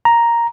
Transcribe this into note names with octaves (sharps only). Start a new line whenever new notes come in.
A#5